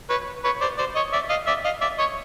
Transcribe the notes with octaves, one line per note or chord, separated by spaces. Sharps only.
B4 C#5
B4 C#5
C5 D5
C5 D5
C#5 D#5
D5 E5
D#5 F5
D5 E5
D#5 F5
D5 E5
C#5 D#5